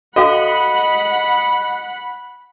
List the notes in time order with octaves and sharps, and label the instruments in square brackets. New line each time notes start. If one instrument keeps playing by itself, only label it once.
[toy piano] F#4 A4 F5 [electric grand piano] D#5 [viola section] F#5 B5